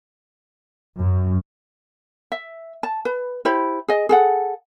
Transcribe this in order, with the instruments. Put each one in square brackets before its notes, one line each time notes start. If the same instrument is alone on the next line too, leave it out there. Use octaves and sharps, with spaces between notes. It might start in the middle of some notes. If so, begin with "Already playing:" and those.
[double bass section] F#2
[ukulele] E5
A5
B4
E4 G4 C5 B5
G#4 D#5
G#4 A4 F#5